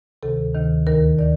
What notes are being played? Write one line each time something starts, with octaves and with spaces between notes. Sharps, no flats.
D2 C3 D#3 A4
D2 C3 D#3
D#2 D#3 A#4
D#3 D5